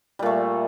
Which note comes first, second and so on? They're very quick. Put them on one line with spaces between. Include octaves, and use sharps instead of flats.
G3 A#2 A3